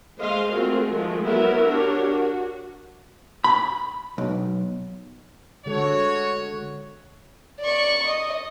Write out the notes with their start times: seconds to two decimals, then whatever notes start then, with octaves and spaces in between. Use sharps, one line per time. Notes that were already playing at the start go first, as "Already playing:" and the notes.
0.18 G#3 C5 D#5 F5 C6
0.52 A3 C4 F4 F#4 G#4 A#4
0.91 D#3 F3 G#3 A3
1.25 F#3 B3 E4 F#4 A#4 E5
1.66 D4 F#4 G4 A#4 C#5
2.09 F#4
3.44 B5
4.18 B1
5.66 D3 G#3 F#4 A4 C#5
7.60 D5 C#6
8.06 D#5